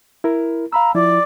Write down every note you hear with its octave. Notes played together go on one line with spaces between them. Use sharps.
E4 A#4
F5 A#5 B5 E6
F3 E4 D5